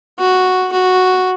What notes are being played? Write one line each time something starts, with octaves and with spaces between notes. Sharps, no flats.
F#4
F#4